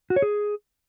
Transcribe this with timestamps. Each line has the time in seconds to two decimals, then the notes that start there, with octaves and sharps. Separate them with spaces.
0.10 F#4
0.16 C#5
0.22 G#4